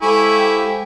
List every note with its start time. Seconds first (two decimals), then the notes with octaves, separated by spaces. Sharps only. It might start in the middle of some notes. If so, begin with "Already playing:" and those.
0.02 G#3 E4 G4 A4 C5 F5 G#5 C#6
0.38 G5